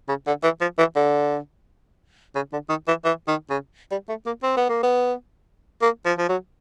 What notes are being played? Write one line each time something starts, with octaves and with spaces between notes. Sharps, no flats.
C#3
D3
E3
F3
E3
D3
C#3
D3
D#3
E3
E3
D#3
C#3
G3
A3
A#3
C4
B3
A#3
B3
A#3
F3
F3
F#3